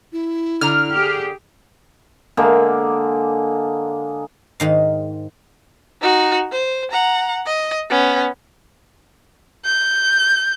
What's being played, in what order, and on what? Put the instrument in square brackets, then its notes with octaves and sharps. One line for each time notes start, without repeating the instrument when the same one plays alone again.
[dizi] E4
[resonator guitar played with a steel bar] D3 A#5 [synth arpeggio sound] F6
[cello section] G4 G#4
[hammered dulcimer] D3 G#3 A#3
[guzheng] G#2 D#3 F5
[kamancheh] D#4 F#4
C5
F#5 A#5
D#5
B3 C#4
[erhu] G6